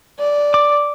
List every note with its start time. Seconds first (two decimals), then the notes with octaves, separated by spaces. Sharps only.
0.19 D5
0.54 D6